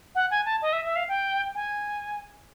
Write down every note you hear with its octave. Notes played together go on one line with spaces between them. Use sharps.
F#5
G#5
A5
D#5
E5
E5
F5
G5
G#5